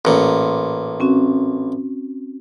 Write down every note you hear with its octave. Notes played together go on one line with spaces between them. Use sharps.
A1 A#2
C4 C#4 F#4